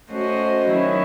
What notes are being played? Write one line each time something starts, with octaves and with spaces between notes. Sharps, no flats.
A3 C#4 F#4 C5 D#5
D#3 F#3 C#4 E4